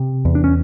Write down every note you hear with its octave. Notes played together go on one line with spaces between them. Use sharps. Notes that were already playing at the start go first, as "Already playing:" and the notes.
Already playing: C3
E2
D4
C#4